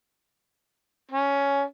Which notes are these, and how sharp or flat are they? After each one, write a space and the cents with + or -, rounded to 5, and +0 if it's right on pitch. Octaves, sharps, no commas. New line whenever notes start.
C#4 +10